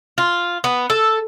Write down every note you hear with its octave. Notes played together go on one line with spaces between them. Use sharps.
F4
B3
A4